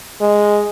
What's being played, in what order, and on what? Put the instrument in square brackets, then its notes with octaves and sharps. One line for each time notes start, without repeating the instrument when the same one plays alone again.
[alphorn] G#3